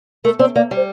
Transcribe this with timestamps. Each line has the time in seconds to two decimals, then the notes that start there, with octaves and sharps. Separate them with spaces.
0.24 A3 A#4
0.39 C4 D5
0.56 A#3 D5
0.71 G3
0.76 C5